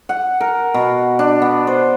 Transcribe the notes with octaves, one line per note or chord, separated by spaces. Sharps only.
F#5
A#4
B2
D4
B3
C5